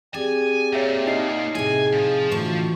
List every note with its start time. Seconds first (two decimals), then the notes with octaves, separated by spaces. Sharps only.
0.14 C4 G4 G#4 D5 G#5
0.73 A#2 C#5 E5 G5
1.07 D#4 D#5 C7
1.55 A2 C3 G#4 G#5
1.93 F3
2.32 A2 D3 E3 F4 F#4